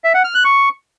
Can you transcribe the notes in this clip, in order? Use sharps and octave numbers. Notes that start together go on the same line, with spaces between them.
E5
F#5
F6
F#6
C#6